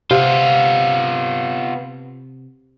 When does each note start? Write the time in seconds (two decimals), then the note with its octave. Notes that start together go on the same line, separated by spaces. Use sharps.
0.11 C3 B3 F4 F5